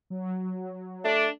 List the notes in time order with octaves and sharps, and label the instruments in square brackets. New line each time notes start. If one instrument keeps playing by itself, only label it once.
[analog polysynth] F#3
[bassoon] A3 [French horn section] D4